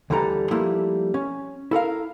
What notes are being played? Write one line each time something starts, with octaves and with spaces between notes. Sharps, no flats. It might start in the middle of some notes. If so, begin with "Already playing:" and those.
D2 D3 E3 G3 A4 A#5
F3 G3 A3 A#3 E4
C#4
E4 A4 A#4 F5